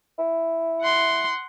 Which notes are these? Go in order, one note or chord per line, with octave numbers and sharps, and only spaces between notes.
E4
F#5 C6